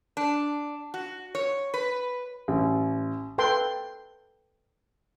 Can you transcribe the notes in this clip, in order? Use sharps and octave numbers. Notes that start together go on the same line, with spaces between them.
D4
F#4
C#5
B4
A1
A4 B4 G5 C6